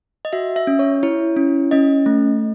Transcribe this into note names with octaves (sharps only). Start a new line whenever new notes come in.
D#5
F#4 E5
E5
C#4
C#5
E4 C#5
C#4
C#4 D#5
A3